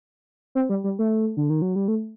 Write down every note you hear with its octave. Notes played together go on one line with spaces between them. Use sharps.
C4
G3
G3
A3
D3
D#3
F#3
G3
A3